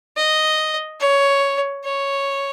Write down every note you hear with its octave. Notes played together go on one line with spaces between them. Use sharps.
D#5
C#5
C#5